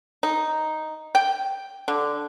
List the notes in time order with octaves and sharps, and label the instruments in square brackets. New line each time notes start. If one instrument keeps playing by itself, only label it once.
[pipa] D#4
G5
D3